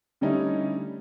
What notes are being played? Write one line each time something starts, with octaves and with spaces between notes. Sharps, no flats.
D3 G3 A3 C#4 D#4 E4